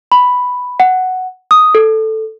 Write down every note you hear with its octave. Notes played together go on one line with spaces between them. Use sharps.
B5
F#5
D#6
A4